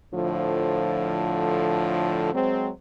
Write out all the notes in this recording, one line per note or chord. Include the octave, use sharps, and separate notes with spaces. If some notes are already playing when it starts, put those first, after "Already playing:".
A2 D3 F3
F#3 G#3 C4